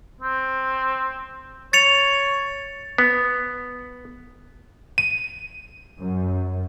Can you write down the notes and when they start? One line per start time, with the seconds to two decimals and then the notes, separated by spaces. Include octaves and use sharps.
0.21 C4
1.73 C#5 A6 C#7 F7
2.98 B3
4.98 D#7
5.99 F#2